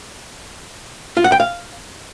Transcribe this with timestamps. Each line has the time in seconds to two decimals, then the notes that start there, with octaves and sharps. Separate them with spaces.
1.17 F4
1.24 F#5
1.32 G5
1.40 F5